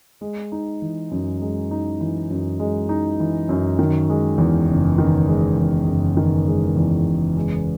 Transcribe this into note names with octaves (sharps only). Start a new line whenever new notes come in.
G#3
D#4
E3
F#2
G#3
D#4
E3
F#2
G#3
D#4
E3
F#2
D#3
G#3
E2
F#1
D#3
G#3
E2
F#1
D#3
G#3
E2
F#1
G#3